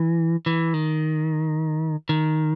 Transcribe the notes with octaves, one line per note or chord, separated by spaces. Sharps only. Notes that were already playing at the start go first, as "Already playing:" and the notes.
Already playing: E3
E3
D#3
D#3